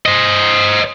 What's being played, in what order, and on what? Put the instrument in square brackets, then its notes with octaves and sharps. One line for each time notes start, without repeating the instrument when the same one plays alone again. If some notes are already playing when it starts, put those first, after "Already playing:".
[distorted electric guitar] C5 D#5